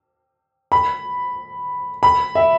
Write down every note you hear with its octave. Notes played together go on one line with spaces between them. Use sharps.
B5
B5
E5